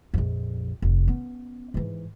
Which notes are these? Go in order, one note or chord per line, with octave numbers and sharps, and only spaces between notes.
A#1 F2
F1
B3 C#4
G#2 E3